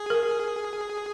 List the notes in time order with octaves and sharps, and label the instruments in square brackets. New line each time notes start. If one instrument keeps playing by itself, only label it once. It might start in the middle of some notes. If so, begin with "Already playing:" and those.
Already playing: [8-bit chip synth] G#4
[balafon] A#4